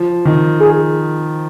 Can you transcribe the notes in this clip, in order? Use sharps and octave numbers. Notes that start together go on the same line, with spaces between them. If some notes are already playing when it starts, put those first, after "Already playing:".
Already playing: F3
D#3
G#4